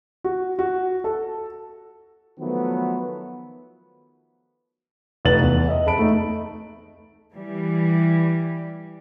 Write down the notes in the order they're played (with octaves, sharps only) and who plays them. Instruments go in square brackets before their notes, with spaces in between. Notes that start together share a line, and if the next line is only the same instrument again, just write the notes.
[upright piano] F#4
F#4
A4
[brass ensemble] D#3 F3 F#3 A3 B3
[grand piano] F1 D#4 B4 A6 F#7
E2
D#5 E5
F2 G#4 A5 B5 D7
A3 D#4
[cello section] E3 G3